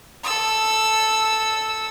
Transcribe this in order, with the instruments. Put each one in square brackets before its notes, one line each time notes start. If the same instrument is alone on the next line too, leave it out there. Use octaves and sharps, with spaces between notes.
[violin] A4 E6